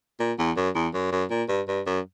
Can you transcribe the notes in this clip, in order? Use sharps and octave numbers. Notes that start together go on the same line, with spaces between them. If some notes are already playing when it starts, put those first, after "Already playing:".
A#2
E2
F#2
E2
F#2
F#2
A#2
G2
G2
F#2